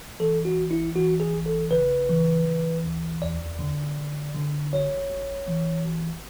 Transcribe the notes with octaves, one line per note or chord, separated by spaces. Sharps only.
E3 A4
F#4
A1
E4
E3 F#4
G#4
A1
A4
C#3 B4
E3
E3
D2
E2 D5
D3
D3
D3
G#1 C#5
G#1
E3
G#1